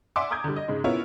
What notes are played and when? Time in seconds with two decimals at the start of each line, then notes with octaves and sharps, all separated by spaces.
0.16 D5 E5 F#5 G#5 C6 D6
0.31 A#5 D6 D#6 G6 G#6
0.44 D3 G3
0.56 D#5
0.68 G#2 C#3 G#3
0.84 B3 C#4 E4 F4 A#4 C#5